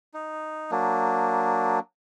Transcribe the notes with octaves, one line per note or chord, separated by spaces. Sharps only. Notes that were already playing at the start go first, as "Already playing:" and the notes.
D#4
F#3 A#3 D4